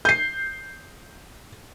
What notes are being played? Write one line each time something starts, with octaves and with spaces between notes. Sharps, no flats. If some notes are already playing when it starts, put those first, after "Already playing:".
G6 C7